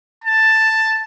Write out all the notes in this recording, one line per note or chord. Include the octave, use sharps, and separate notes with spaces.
A5